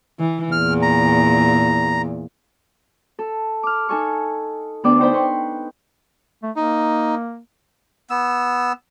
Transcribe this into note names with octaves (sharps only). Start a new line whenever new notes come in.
E3
E2 A#2 F6
A#5
A4
D6 F6
D#4 A4 G#5 C#6
D2 B3 D4 D5 G5 D6
D#4 C5 D5 G5 B5
B4 C6 C#6
A3
A#3 D#4
B3 E6